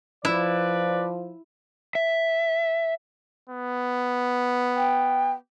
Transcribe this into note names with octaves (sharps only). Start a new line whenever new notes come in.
F3 E4 B4 D5
E5
B3
G5